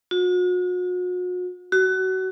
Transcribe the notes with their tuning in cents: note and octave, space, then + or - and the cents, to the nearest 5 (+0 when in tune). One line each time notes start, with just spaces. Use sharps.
F#4 -40
F#4 +25